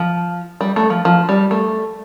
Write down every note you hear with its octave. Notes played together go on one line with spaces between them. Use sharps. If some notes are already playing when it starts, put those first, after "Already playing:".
Already playing: F3
G3
A3
F3
F3
G3
A3